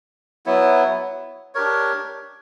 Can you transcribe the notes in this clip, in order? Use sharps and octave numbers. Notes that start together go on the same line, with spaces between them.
F#3 B3 E4
D4 G4 A#4 C#5